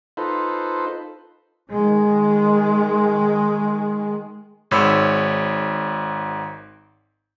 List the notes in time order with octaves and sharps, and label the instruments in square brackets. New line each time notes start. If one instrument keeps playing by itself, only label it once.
[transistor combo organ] D#4 F4 A4 B4 C5
[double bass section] D#3 G#3
[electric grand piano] G#1 G#2 C#5 B5 E6